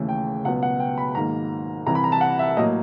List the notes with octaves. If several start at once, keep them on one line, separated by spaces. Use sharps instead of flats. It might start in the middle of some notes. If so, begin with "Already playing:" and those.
Already playing: D#2 C#3 E3 A3
G5
C#2 B2 F#3 B3 F#5
F#5
G5
B5
G#2 D#3 F#3 A#3 A#5
C2 C3 E3 G3 A#5
B5
A#5
A5
F#5
E5
A2 F#3 A#3 D#5